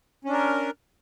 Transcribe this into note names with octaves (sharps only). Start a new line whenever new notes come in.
C#4 D4 A#4